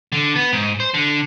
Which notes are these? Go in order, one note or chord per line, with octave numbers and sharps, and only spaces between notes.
D3
B3
G#2
C5
D3